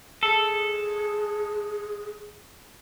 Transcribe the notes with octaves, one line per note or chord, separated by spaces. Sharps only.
G#4 A4